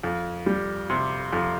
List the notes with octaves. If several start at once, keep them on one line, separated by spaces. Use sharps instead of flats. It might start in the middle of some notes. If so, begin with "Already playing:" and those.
F2
G3
C3
F2